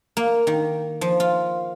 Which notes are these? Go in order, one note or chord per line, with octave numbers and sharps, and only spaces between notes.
A#3
D#3
F3
F4